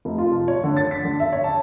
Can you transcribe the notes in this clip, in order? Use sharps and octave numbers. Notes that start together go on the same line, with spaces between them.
F1
F4
F3
C#5
D3
A6
B6
D3
E5
C#5
A5